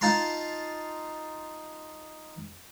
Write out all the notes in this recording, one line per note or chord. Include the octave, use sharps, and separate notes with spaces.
D#4 F4 A5 A#5 C6